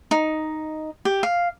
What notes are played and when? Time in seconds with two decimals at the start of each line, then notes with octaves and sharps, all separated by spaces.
0.11 D#4
1.05 G4
1.23 F5